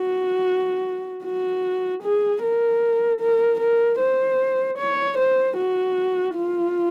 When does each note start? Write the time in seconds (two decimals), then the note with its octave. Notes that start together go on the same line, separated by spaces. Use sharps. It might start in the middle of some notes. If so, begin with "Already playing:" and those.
Already playing: F#4
1.24 F#4
2.03 G#4
2.42 A#4
3.21 A#4
3.60 A#4
4.00 C5
4.78 C#5
5.18 C5
5.57 F#4
6.36 F4